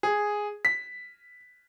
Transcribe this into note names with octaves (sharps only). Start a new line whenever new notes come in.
G#4
B6